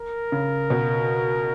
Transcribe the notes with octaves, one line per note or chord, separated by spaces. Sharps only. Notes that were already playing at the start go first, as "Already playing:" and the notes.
Already playing: A#4
C#3
B2